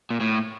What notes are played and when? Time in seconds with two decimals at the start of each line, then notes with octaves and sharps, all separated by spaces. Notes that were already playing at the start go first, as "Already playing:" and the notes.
0.10 A#2
0.20 A2